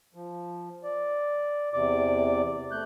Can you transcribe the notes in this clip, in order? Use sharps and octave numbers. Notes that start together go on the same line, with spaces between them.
F3
D5
E2 C3 D5 D6
A3 F#6 G6